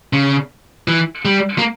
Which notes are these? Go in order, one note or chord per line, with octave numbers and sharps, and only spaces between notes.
C#3
E3
G3
A#3